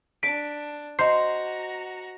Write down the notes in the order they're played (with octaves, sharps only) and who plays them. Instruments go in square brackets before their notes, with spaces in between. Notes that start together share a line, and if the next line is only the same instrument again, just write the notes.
[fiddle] D4 [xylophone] B6 [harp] D7
[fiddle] F#4 A#5 [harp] C5 [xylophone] D#5 C7